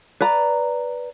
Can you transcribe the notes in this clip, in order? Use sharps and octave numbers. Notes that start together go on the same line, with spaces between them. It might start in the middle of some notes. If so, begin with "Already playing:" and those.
B4 D5 A#5